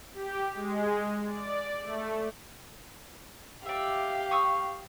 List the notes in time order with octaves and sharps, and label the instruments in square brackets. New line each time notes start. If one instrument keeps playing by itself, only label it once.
[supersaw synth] G4
G#3
D5
A3
[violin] G4 F5 [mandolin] D5 E5
[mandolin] C#6 D#6 E6